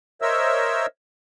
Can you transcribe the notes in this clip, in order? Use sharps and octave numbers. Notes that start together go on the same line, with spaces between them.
A#4 C5 C#5 D#5 E5 E6